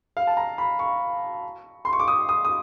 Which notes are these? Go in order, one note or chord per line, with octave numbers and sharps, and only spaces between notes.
F5
A5
A#5
B5
C#6
C6
C#6
D6
D#6
D#6
D#6